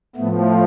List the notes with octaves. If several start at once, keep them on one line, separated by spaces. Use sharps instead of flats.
A2 F3 A3 B3